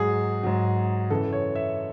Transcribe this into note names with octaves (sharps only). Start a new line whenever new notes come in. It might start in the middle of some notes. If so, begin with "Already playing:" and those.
Already playing: G#2 F#3 G#4
G#2 F#3
F#2 C#3 E3 A4
C#5
E5